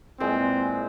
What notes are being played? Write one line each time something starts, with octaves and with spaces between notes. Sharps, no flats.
A#2 E3 G#3 C4